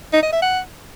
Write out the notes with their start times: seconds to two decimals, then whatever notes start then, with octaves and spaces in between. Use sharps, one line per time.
0.13 D#4
0.23 D#5
0.32 E5
0.42 F#5